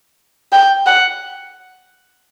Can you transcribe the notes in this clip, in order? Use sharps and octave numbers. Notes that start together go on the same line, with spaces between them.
G5
F#5